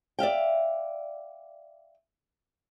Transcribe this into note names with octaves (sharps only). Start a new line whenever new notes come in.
D5 E5 F5 G5